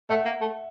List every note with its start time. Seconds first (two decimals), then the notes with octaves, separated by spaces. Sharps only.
0.10 A3 E5 F#5
0.25 A#3
0.41 A3